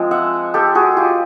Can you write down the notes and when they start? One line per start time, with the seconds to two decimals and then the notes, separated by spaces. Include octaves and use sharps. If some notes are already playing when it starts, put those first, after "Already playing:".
Already playing: F3 G#3 C4
0.11 E5 F#5
0.54 G4 A4
0.75 F#4 G#4
0.97 F4 G4